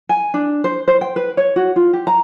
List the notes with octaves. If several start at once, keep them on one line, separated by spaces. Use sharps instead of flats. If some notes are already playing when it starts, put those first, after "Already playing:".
G#5
D4
C5
C5
G5
B4
C#5
F#4
F4
G4
A#5